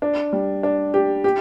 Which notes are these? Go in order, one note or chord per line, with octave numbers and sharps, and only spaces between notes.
D4
G3
D4
G4
G4